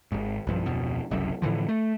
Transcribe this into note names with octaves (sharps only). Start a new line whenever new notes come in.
G#1 G#2
B1 G2 F3
D1 F2 B2
F#1 C2 F#2
A2 D3 E3 F3
A3